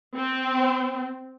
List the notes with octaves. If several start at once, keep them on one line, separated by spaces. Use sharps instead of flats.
C4